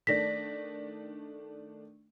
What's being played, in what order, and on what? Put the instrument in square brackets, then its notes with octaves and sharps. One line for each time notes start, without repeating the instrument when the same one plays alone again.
[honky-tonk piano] D#3 A3 D4 [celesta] D5 A#6 B6